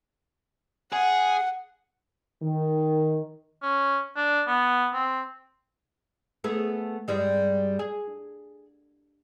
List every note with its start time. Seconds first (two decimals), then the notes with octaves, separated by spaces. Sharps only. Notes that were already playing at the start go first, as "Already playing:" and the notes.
0.93 G#4 F#5
2.42 D#3
3.62 C#4
4.17 D4
4.47 B3
4.94 C4
6.44 A3 B3 G#4
7.08 G2 G3 G#3
7.79 G#4